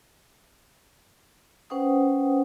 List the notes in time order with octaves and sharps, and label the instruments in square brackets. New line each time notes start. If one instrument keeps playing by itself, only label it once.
[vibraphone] C#4 B4 C5 F#5 G5 D#6